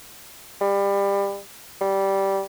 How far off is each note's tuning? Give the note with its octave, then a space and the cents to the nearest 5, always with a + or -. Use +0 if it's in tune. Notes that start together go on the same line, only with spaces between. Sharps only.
G3 +25
G3 -10